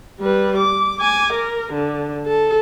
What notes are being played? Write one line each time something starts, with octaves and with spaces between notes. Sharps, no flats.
G3 B4
D6
G#5 D6
A#4
D3
A4